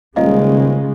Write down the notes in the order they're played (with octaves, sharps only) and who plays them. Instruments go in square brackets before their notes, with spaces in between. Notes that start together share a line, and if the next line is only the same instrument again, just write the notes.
[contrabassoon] D#1 [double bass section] C#3 G#3 [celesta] F4 D#5 F5